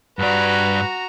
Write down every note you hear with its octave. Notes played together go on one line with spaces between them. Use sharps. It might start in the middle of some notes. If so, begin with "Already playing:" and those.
G2 F#4 B4 D5 A#5